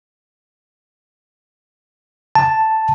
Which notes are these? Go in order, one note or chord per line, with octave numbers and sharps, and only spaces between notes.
A5